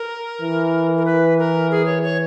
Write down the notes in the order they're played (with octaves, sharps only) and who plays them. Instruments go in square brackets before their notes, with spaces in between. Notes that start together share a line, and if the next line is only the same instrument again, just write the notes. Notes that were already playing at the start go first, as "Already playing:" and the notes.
Already playing: [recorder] A#4
[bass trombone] E3
[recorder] A#4
B4
A#4
G#4
C#5
C#5